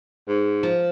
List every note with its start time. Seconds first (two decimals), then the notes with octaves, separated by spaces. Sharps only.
0.28 G#2
0.63 F3